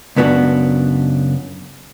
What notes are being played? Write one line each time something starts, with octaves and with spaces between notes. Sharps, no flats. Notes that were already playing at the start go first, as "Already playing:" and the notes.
C#2 F#2 B3 D4 F#4